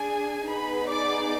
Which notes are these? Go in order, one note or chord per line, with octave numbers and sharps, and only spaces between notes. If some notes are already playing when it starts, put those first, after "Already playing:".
Already playing: D4 G#4 G#5
B3 D#4 G#4 B4 B5
D5 D6